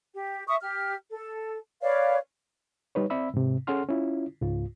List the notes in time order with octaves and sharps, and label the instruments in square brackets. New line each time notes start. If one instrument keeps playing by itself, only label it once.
[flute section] G4
E5 C#6 D#6
G4 F6
A4
B4 C#5 D5 F5
[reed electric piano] G3 D#4 B4 C#5
C4 D5 E5 B5 E6
G#2 C3
C#4 G#4 A4 F#5 C6 F6
C#4 E4 F4
C#2 G#2 F4